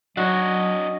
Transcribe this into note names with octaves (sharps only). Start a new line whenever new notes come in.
F#3 D4 F#4 C#5 D#5